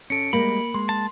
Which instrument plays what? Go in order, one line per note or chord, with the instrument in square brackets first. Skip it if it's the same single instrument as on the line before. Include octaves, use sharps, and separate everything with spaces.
[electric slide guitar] C#4 A4 [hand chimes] C#7 D7
[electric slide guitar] G3 G#3 [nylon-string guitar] A#3 [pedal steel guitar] B5
[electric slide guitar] G#3 [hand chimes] C6
[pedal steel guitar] A5